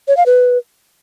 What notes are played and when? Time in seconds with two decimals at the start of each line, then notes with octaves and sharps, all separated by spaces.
0.08 C#5
0.17 F5
0.26 B4